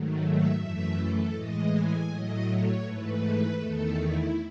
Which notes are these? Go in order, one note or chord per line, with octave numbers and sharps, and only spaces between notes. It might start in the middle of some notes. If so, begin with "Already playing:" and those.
Already playing: G#2 D#3 F#3 A3
E5
F#2 E3 A3 E5
A4
A2 E3 G#3 D#5
G#5
A2 F#3 A3 D#5
C#5
G#2 E3 A3 B4
E2 D#3 A3 A4
E4